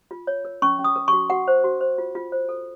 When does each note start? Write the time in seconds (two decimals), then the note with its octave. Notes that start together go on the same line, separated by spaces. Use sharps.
0.11 F4
0.27 C#5
0.45 A#4
0.62 C#4 C#6
0.79 C#4
0.84 D#6
0.96 A#4
1.08 F#4 C#6
1.30 F#4 F#5
1.48 C5
1.64 F#4
1.81 C5
1.98 F4
2.15 F4
2.32 C5
2.49 A4